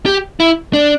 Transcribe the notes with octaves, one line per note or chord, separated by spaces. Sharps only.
G4
E4
D4